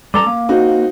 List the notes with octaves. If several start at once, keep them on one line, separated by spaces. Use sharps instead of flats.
G3 A4 A#5 D6
A#3
C4 D#4 F#4